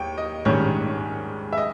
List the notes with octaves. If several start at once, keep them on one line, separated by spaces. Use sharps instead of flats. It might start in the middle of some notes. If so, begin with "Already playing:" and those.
Already playing: D#2 G5
D#5
A#1 G#2 D#3 G3 C#4 C#5
E5
D#5